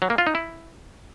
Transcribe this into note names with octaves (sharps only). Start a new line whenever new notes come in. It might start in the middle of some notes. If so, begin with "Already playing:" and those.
F#3
A#3
F4
D#4
E4